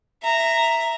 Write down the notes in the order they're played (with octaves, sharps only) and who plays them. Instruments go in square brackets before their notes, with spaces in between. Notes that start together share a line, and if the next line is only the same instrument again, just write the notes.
[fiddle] E5 A#5